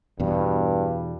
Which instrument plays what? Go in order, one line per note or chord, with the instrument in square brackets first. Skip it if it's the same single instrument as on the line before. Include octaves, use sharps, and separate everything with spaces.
[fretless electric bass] E2 B2 [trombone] G2